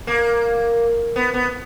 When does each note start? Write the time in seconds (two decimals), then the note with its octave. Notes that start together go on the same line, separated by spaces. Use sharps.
0.07 A#3
1.16 B3
1.34 B3